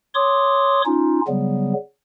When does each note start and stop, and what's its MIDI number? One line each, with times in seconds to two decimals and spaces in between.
0.14 0.82 73
0.14 0.82 84
0.14 0.82 86
0.14 0.82 87
0.85 1.21 61
0.85 1.21 63
0.85 1.21 65
1.28 1.73 49
1.28 1.73 54
1.28 1.73 55
1.28 1.73 59